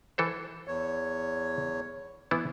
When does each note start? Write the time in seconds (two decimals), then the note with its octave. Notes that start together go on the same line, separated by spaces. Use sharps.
0.18 E3 A4 C5
0.68 E2 C#5
2.31 E3 B3 E4